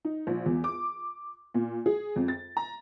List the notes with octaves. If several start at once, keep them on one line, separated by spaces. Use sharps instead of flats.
D#4
A#1
E2
D6
A#2
G#4
F2
A6
A#5